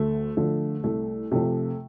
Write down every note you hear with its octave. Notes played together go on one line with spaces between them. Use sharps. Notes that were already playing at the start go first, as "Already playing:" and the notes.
Already playing: D2 A3
D3 F3 A3
C2 A3
C3 F3 A3